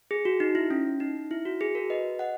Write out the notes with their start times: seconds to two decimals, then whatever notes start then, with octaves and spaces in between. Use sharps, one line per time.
0.11 G#4
0.25 F#4
0.40 D#4
0.55 E4
0.70 C#4
1.00 D#4
1.31 E4
1.45 F#4
1.61 G#4
1.75 F#4 A#4
1.90 B4 D#5
2.19 D#5 F#5